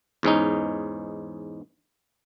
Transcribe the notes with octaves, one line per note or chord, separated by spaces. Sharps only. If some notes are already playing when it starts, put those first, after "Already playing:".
E2 G#2 C#4 D#4